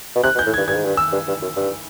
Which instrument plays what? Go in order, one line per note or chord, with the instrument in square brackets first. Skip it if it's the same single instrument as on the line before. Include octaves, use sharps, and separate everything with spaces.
[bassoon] B2
[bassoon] C3 [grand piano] F#6
[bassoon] B2
[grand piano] G6
[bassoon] A2
[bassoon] G2 [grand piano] G#6
[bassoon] G2 [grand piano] G#6
[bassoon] G#2
G2
[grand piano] E6
[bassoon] G2
G2
F#2
G2